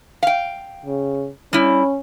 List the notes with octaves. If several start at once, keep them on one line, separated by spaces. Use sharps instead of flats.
F5 G5
C#3
G3 C#4 E4